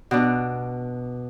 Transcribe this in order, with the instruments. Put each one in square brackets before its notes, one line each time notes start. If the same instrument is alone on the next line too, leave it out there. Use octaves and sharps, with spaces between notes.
[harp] B2 D4